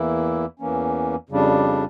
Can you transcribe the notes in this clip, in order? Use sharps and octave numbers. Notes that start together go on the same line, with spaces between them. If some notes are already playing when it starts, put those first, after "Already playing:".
Already playing: E2 E3 A#3 E4
E2 E3 A#3 C#4
F2 C#3 G3 D4